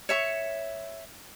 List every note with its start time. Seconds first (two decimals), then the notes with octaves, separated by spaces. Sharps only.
0.09 C#5 E5 C#6